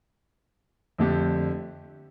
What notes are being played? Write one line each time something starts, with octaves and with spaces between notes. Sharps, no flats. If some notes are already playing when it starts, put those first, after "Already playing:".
F2 D3 A3 D4 G4